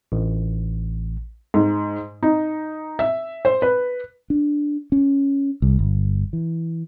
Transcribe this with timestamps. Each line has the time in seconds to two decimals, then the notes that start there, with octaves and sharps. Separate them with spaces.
0.12 A1
1.54 G#2
2.23 D#4
2.99 E5
3.45 C5
3.62 B4
4.30 D4
4.92 C#4
5.62 C2
5.79 G1
6.33 E3